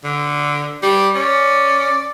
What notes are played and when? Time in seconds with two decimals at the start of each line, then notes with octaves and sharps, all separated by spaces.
0.04 D3
0.83 G3 G4
1.15 C#4 D5